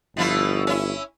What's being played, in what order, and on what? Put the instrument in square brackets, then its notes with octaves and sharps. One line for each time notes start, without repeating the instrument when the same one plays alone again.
[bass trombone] G1 [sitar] B2 F3 E4
[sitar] C#4 E4